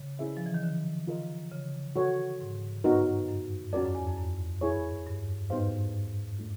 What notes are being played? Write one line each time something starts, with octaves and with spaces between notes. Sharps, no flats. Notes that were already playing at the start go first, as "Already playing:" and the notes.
Already playing: C#3
C#4 E4 G#4 C5 E5
F3
E3
D#3
D3
F4 A#4 D#5
C#3
F#4 A4 C#5 F#5
G#2
G2 B3 D#4 F#4 A#4
F#2
F2 C#4 F#4 A#4 D5
F#2
E2
F2
F#2
E4 G#4 C#5
G2
G#2 B3 D#4 G4 C5 F5
A3 D4 F4